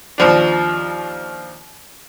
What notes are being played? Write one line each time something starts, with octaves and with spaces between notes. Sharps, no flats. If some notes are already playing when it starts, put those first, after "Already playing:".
D#2 F3 D4